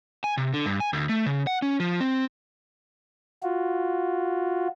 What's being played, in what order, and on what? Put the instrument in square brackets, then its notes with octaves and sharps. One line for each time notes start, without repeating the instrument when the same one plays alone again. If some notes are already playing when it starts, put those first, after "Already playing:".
[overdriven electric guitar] G#5
C3
D3
G2
G#5
D2
A3
C#3
F#5
C#4
F3
C4
[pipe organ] F4 F#4